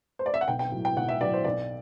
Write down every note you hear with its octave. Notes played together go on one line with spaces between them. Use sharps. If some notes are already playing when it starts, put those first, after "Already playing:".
C5
D5
E5
F#5
B1 G5
G5
A2 F#3
G5
B1 F#5
E5
A2 F#3 D5
C5
B1 D5